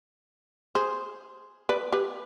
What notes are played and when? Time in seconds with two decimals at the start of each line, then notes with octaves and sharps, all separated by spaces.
0.75 G#4 C5
1.69 B4 D5
1.92 G4 B4